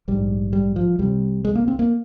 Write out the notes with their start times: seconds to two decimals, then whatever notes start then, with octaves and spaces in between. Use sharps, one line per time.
0.08 A#1 G#2 G3
0.53 G3
0.76 F3
0.99 C2 C3 G3
1.45 G#3
1.55 A#3
1.68 C4
1.79 A#3